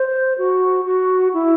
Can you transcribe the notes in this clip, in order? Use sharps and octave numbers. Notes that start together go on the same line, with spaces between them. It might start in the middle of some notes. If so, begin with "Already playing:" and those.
Already playing: C5
F#4
F#4
E4